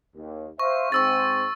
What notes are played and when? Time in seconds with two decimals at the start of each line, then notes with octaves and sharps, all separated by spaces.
0.16 D#2
0.59 C5 E5 F5 C#6
0.92 G#2 C4 C#6 E6 A6